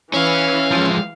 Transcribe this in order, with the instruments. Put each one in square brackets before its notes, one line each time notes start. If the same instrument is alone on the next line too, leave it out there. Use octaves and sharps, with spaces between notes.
[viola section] E3 [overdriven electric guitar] C#4 [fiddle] F5
[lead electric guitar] F3 G#3